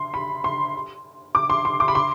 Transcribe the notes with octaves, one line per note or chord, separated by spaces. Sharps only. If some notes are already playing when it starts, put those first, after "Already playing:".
Already playing: C6
B5
C6
D6
C6
C6
D6
B5
C6